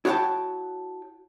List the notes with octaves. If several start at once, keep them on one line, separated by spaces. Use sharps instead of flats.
E4 F#4 C#5 F5 G5 A5